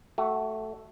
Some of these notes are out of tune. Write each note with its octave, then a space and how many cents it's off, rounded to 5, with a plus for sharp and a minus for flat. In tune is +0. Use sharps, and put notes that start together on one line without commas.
A3 +0 F#4 +25